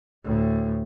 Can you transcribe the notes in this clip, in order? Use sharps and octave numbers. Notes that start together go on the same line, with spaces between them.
D2 A2